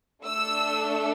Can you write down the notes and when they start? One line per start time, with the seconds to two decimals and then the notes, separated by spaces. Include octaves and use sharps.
0.25 A3 D4 A4 E6